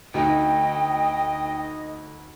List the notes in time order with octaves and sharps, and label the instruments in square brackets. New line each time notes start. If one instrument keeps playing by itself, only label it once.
[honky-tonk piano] D2 D#4 [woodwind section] D#5 [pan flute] G5